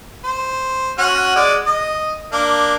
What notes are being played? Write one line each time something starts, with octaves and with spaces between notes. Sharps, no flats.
C5
C#4 F#4 F#5
G#3 D5
D#5
A#3 D4